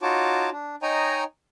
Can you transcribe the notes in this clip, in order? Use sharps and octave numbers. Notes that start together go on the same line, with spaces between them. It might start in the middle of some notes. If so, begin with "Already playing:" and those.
D#4 F4 F#4 C#5 A5 D6
D4
D#4 C#5 D#5 G5 G#5 A#5